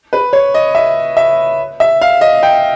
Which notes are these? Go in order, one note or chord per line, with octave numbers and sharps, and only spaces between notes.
B4
C#5
D#5
E5
E5
E5
F5
D#5
G5